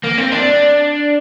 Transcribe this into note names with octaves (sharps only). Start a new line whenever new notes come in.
A#3
C4
D4